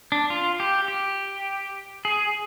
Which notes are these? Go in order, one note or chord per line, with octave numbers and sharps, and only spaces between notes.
D4
F4
G4
G4
G#4